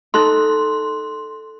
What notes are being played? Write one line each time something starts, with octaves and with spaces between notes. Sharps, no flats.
D#4 A4 C6 F#6